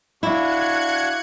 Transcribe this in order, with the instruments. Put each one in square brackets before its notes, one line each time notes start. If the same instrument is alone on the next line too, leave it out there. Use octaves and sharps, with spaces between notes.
[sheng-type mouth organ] D4 F#4 [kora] E4 [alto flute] F5 [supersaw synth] F#6 G#6 C#7